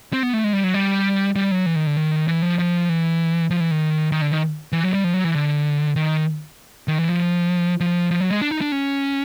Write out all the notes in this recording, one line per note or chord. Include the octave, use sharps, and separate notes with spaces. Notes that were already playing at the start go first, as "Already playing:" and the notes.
C4
B3
A3
G#3
G3
F#3
G3
G3
F#3
E3
D#3
D3
D#3
E3
F3
F3
E3
F3
E3
D#3
D#3
D3
D#3
E3
F#3
G3
F3
F#3
E3
D3
D#3
D#3
E3
F3
F3
F3
F#3
G#3
D4
D#4
D4
C#4